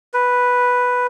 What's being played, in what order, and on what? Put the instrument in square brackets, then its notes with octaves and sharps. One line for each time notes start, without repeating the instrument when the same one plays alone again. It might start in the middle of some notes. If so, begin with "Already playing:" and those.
[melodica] B4